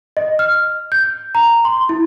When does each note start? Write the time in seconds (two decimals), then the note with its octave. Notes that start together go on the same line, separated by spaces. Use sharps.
0.17 D#5
0.39 F6
0.92 G6
1.35 A#5
1.65 C6
1.89 E4